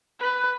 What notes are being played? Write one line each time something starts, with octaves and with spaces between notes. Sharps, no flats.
B4